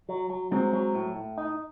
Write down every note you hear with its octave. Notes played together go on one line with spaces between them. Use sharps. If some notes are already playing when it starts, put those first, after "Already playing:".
F#3
F#3
F#3 G#3 C4
F#3
A2
A2
D#4